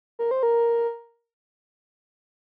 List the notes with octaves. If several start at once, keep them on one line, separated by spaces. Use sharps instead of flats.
A#4
C5
A#4